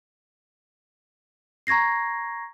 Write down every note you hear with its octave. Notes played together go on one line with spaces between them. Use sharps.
A#5 C#6 G#6 A#6 C7